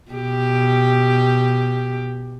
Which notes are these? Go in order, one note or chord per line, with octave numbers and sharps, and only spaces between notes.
B2 G4